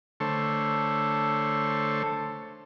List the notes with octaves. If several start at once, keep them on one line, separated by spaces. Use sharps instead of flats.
D3 A3 A4 C5 C#5